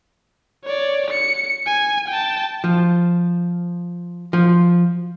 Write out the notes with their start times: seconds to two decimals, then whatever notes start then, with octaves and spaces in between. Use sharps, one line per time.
0.64 C#5 D5
1.11 C#7
1.67 G#5
2.08 G5 A5
2.64 F3
4.33 F3